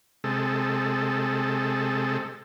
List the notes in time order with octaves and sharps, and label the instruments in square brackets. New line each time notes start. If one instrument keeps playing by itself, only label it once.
[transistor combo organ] C3 G#3 A4